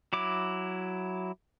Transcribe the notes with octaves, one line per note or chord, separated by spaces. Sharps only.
F#3 E4 D6